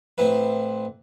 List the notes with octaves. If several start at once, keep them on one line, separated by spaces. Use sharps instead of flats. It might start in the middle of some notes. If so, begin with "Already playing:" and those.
A1 C4 E4 B4